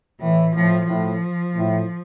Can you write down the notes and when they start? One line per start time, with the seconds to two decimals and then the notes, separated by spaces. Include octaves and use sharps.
0.21 A2 E3
0.54 A2 F3
0.88 A2 F3
1.54 A2